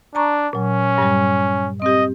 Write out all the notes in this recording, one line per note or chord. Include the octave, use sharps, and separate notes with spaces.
D4 A5 A#5 C#6
A#2 F#3 C#4
G2 G3
C4 G4 D#5